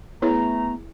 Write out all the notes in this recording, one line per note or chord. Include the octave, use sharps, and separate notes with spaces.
E3 A3 B3 E4 G#4 C#5 A#5